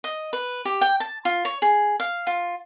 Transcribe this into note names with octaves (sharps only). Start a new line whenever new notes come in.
D#5
B4
G4
G5
A5
F4
C#5
G#4
F5
F4